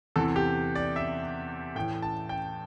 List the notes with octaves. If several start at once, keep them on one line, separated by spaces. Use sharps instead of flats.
E2 C3 E3 A4
G4
D5
E5
A2 E3 G5
A5
G5